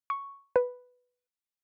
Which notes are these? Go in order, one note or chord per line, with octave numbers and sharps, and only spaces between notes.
C#6
B4